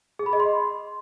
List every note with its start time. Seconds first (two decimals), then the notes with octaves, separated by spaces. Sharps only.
0.19 G#4
0.26 B5
0.33 D#5
0.40 C6